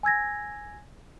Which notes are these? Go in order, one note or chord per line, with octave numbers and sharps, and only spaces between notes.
G#5 E6 G#6 A#6